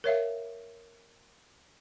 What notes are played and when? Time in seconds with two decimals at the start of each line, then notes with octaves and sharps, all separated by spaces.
0.04 A#4 C#5 E5 F5